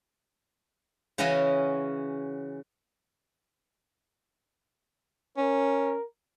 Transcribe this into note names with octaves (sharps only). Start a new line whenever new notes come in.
C#3 E3 C#4 F#4 D#5 G#5
C#4 A#4